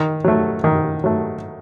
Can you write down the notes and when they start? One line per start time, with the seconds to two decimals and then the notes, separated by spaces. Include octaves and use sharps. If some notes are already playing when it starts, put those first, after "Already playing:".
Already playing: D#3
0.24 F#3 A3
0.64 D#3
1.04 F#3 A3